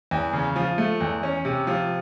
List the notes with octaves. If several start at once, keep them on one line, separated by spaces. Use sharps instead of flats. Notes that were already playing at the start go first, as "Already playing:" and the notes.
E2
C#3
F3
A3
E2
C#4
C3
F3